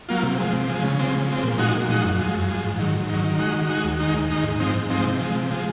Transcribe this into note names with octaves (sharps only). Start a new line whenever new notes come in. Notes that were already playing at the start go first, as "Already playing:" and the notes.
F#3 A#3 F4
C3
F3 G#3
C3
F3 G#3
C#3
F3 G#3 C4
C#3
F3 G#3 C4
A#2
F3 G#3 D#4 F#4
A#2
F3 G#3 D#4 F#4
F#2
F3 G#3
F#2
F3 G#3
G#2
D#3 F#3
G#2
D#3 F#3
D#3
G#3 D#4 F#4
D#3
G#3 D#4 F#4
D#2
D#3 G#3 D#4
D#2
D#3 G#3 D#4
G#2
F3 G#3 C4 D#4
G#2
F3 G#3 C4 D#4
C3
F3 G#3
C3
F3 G#3